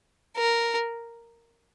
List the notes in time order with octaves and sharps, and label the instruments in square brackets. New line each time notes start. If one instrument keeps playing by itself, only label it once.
[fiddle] A#4